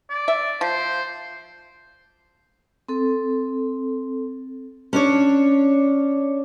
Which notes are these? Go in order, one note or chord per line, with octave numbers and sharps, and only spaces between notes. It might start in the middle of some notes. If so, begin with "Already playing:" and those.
D5
E5
F3 C5
C4 A4
C#4 D4 C#5